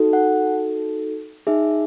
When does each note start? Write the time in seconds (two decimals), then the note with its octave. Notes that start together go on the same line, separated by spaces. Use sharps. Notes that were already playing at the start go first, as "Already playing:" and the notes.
Already playing: D#4 F#4 A4
0.13 F#5
1.47 D#4 G#4 E5